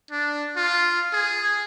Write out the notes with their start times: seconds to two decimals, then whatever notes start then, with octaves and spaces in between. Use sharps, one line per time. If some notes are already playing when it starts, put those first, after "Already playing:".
0.11 D4
0.56 F4
1.13 G#4